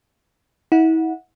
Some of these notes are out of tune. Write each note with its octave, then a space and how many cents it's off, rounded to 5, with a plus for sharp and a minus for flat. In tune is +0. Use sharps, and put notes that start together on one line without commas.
E4 -40 F#5 -20